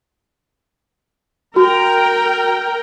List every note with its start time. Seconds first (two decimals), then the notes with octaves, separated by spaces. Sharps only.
1.56 F#4 A#4 G5